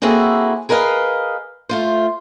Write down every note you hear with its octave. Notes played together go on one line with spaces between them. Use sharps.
A#3 C4 E4 F#4 G#4 A4
G#4 A#4 B4 D#5 F5
A3 F4 C5